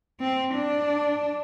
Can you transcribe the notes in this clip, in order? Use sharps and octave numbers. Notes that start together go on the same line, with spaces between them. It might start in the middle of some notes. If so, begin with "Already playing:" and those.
C4
D4